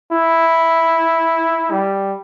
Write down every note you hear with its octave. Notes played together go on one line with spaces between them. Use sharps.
E4
G3